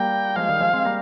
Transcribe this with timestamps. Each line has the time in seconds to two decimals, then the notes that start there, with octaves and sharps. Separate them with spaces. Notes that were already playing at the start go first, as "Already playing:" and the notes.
Already playing: G3 A#3 G5
0.36 F3 G#3 F5
0.49 D#3 G3
0.61 F3 G#3
0.73 G#3 C4
0.85 G3 A#3